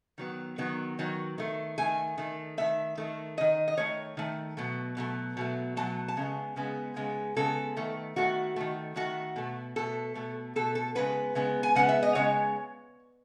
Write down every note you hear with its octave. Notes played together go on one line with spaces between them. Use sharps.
D#3 F#3 B3
D#3 F#3 B3
D#3 F#3
D#3 A3
D#3 A3 G#5
D#3 A3
D#3 A3 E5
D#3 A3
D#3 A3 D#5
D#5
D#3 A3 C#5
D#3 A3
B2 F#3 A3
B2 F#3 A3
B2 F#3 A3
B2 F#3 A3 A5
A5
C#3 G#3 B3
C#3 G#3 B3
C#3 G#3 B3
C#3 G#3 B3 A4
D#3 A3
D#3 A3 F#4
D#3 A3
D#3 A3 F#4
B2 A3
B2 A3 A4
B2 A3
B2 A3 A4
A4
C#3 G#3 B3 B4
C#3 G#3 B3
G#5
C#3 G#3 B3 F#5
E5
D#5
C#3 G#3 B3 C#5